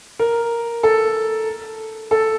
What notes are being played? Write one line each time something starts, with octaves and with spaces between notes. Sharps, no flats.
A#4
A4
A4